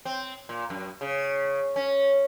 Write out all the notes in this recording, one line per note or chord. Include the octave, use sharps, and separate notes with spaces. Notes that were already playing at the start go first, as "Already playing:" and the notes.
C4
A#2
F#2
C#3
C#4